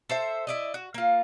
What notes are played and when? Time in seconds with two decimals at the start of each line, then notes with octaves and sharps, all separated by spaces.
0.09 A4 C5 E5
0.47 E4 D5 D#5
0.74 F#4
0.94 A#3 F4